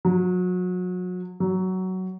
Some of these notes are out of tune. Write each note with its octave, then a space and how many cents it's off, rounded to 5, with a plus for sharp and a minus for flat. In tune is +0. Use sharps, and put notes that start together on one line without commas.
F#3 -30
F#3 +15